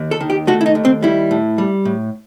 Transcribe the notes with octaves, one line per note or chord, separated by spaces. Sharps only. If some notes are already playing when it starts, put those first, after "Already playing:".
Already playing: D#2
A4
D#3
G4
A3 F#4
E4
D#4
D#2
C4
G3 E4
A2
G3
A2